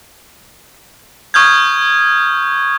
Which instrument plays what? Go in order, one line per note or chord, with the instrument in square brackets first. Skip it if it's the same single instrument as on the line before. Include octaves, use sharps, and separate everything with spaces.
[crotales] C#6 D#6 F6 G6 G#6